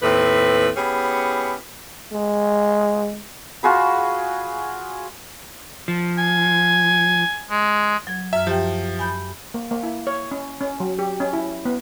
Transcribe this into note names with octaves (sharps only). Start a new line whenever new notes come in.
D#2 A2 C4 B4
B3 C#4 E4 G4 G#4
G#3
F4 F#4 G#4 B5
F3
G#5
G#3
F#3 G#6
F#2 E5 F6
F3 G4 E5 G5
G#5 B5 G6
A#3
A#3
E4
C#5
C#4
C#4
F#3
G4
C#4
E4
B3